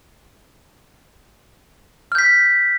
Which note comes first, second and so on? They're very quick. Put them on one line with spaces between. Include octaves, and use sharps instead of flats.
F6 G6 B6